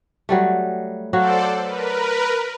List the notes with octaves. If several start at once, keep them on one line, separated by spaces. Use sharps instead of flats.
F#3 G3 A3
F#3 F#4 A4 C5 D5 F5
A#4 B4